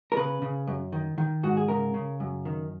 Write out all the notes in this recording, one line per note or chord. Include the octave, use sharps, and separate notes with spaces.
A#4
C#3 B4
C#3
F#2
D#3
D#3
G#2 F#4
G#4
C#3 A#4
C#3
F#2
D#3